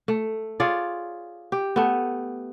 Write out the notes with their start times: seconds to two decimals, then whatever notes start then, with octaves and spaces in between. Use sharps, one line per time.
0.08 A3
0.60 F4 G#4 C#5 D5
1.52 G4
1.76 A3 B3